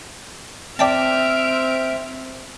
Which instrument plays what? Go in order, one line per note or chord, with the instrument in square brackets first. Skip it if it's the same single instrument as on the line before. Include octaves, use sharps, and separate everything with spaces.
[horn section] C4 [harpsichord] D5 G5 A5 [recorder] E5 [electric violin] F6 D7